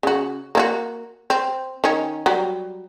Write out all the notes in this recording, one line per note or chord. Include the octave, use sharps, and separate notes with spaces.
C#3 F#4
A#3 E4 F#4
C4
D#3 C#4
F#3 G3